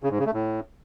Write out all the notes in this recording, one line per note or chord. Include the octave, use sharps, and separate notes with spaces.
C#3
G#2
C#3
A3
A2